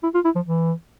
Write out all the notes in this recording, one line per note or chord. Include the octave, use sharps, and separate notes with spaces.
E4
F4
E4
F3
E3